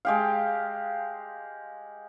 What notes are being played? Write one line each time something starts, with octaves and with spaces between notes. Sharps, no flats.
G#3 G4 F5